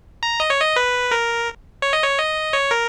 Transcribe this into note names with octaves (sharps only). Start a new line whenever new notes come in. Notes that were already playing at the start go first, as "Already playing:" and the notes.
A#5
D#5
C#5
D#5
B4
A#4
C#5
D#5
C#5
D#5
C#5
A#4